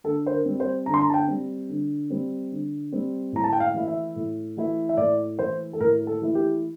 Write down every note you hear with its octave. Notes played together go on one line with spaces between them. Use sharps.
D3 A4
C5
A#4
G3 C4
C5
D3 A#5
C6
A#5
A5
G5
G3 C4
D3
G3 C4
D3
G3 C4
A2 A#5
A5
G5
F5
E3 A3 E4
E5
A2
E3 A3 E4
E5
A2 D5
E3 A3 E4 C5
A4
A2 A#4
A4
E3 A3 E4
G4